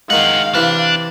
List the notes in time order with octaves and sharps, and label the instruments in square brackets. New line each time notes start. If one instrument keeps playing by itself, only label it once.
[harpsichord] D#3 G#3 [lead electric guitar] G#4 F#5 [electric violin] F5
[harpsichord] C3 E3 [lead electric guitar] D4